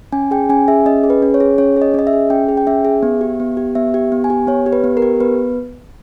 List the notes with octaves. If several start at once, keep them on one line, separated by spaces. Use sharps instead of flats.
C#4 G#5
G#4 G5
C#4 G#5
G#4 E5
C#4 D#5
G#4
B4
C#4
C#5
G#4
C#4 C#5
G#4
D#5
C#4 D#5
E5
G#4
C#4 G5
G#4
G5
C#4 E5
G#4
B3
G4
B3
G4
B3 E5
G4
B3
G#5
G4
B3 C#5
G4
B4
B3
A#4
G4
B3 B4